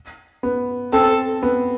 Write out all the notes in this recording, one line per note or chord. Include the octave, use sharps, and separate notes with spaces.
B3
C4 A4
B3